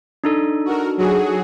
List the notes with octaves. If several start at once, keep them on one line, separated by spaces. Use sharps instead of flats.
D4 D#4 A4
F#4 A#4
F#3 F#4 G#4